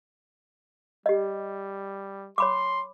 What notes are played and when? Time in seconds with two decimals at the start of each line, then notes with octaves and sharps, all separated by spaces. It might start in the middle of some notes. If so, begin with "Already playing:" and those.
1.06 G3 G4 D#5
2.38 C#5 B5 C6 D6